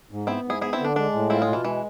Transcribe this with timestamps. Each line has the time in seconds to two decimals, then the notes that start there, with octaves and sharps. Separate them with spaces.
0.11 G#2
0.27 B3 C4 E4
0.44 G#2
0.50 E4 G#4
0.61 B3 E4 G#4
0.73 C4 E4
0.79 D3
0.85 D4
0.96 G#3 D4
1.13 A2
1.30 C4 E4 F4
1.42 G#3
1.47 B2
1.53 E3
1.64 E3 G#3